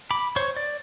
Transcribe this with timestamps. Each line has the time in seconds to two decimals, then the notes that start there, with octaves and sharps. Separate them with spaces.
0.11 B5 D6
0.36 C5 C#5 C6 C#6
0.56 D5